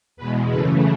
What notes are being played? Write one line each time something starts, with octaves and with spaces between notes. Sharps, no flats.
E2 B2 G#3 B4
F#2 C#3 E3 A3 B4